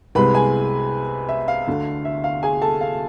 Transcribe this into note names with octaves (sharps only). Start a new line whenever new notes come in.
C2 C3 G#3 B4 B5
G#4 G#5
E5
F5
D2 D3 A3
E5
F5
G#4 G#5
A4 A5
F5